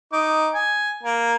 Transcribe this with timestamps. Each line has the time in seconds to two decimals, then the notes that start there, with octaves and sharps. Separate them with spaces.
0.13 D#4 D6
0.54 G#5
1.03 A#3